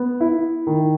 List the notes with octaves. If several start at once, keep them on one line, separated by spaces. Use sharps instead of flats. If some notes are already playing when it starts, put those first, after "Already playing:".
Already playing: B3
E4
D#3